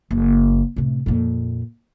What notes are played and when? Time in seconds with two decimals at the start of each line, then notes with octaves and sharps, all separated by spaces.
0.11 F#1
0.76 A2 C3
1.06 F2 A#2